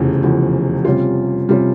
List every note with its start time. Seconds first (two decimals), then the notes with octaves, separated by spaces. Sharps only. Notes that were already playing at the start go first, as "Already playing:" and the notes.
Already playing: F1 E2 C#3 F3
0.23 F1 E2 C#3 F3
0.85 C3 G3 C#4 F4
1.49 C3 G3 C#4 F4